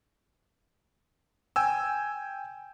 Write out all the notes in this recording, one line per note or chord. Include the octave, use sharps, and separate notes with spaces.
G5 G#5 E6